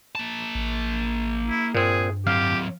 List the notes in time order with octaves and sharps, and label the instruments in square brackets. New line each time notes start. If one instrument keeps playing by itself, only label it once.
[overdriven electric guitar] A#3 A5
[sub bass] A1
[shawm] E4
[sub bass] G2 [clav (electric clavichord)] A#2 C4 [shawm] G#4
[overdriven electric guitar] F#3 C4 [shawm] G4 [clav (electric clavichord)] F5